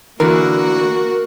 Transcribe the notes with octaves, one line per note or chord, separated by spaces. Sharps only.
D3 E3 A#3 F#4 A#4